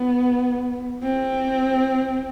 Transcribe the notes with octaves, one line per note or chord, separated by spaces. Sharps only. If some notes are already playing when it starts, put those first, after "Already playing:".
Already playing: B3
C4